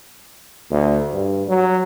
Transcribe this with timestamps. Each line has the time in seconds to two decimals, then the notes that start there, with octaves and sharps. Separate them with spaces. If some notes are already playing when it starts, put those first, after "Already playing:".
0.71 D2
1.13 G2
1.48 F#3